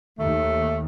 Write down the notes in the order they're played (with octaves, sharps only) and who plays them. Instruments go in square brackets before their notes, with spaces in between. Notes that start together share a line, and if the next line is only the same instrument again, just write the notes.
[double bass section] D#2 [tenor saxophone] A3